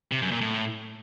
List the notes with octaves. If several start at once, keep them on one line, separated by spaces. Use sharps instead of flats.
C3
F#2
A#2
A2